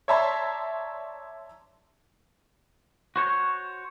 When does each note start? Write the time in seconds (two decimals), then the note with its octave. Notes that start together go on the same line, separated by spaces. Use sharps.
0.08 C#5 D5 E5 A5 A#5 C6
3.16 F#4 C5 C#5